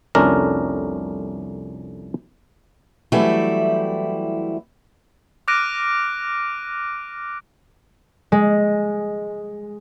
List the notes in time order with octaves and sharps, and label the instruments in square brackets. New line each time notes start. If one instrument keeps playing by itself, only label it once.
[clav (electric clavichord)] C2 F2 A3 C#4 D4 A#4
[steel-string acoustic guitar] E3 F#3 G3 A3 C4 E4
[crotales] D6 F6 F#6 A#6 D7 D#7
[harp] G#3